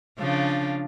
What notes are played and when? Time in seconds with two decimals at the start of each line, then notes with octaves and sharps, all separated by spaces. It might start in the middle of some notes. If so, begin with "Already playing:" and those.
0.19 C#3 F3 D4